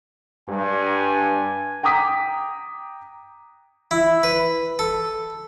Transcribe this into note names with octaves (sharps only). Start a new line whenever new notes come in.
G2 G#5
G5 A#5 D6 D#6 B6
E4
B4
A4